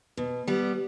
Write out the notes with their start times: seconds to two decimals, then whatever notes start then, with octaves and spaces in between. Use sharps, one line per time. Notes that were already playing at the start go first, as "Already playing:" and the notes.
0.17 B2
0.47 G3 B3